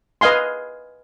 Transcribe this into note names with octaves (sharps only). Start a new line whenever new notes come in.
B4 D#5 F5 G#5 C6